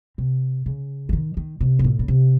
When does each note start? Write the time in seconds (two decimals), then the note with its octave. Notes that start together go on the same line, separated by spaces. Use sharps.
0.18 C3
0.66 C#3
1.09 E3
1.13 D#3
1.37 D#3
1.61 C3
1.79 G#2
1.84 A2
1.99 C#3
2.08 C3